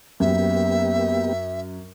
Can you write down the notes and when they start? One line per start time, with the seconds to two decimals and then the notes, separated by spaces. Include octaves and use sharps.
0.20 F#2 A#3 B3 G4 E5